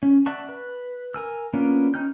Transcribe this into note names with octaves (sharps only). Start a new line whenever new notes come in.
C#4
D5 E5 F#5 A5 C#6
B4
A#4 G#5 E6
A#3 B3 C#4 D4 F4
C#4 D#4 G5 F6 G6